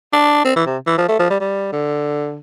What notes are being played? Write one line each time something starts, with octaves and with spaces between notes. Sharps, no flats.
D4
C4
E3
C3
E3
F3
A3
F3
G3
G3
D3